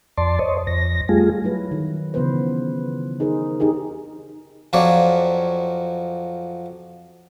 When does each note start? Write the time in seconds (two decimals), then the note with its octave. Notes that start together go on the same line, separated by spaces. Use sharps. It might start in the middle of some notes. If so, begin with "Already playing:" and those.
0.18 F2 D5 A5 C6
0.39 C5 C#5 D#5
0.67 F2 A#6
1.09 G3 A3 F4 G#4
1.44 F#3 E4 B4
1.71 D#3
2.14 C#3 E3 B3 F4 B4 C5
3.20 D#4 G#4 A#4 C5
3.60 D#4 G4 G#4 A#4
4.73 F2 F3 F#3 C#5 D5